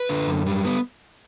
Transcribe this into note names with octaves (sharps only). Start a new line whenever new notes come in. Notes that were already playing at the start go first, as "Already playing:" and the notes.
Already playing: B4
D3
F#2
G3
B3